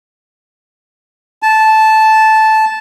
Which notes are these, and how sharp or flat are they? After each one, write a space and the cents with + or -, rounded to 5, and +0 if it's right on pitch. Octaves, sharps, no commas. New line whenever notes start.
A5 -10